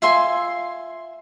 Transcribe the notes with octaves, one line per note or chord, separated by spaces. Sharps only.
F4 E5 G#5 C6